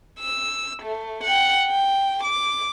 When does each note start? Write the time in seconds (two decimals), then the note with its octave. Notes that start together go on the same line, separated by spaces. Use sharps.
0.20 E6
0.83 A3
1.24 F#5 G5
1.67 G5
2.23 D6